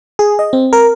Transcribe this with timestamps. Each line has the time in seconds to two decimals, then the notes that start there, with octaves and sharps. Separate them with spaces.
0.19 G#4
0.39 D#5
0.53 C4
0.73 A#4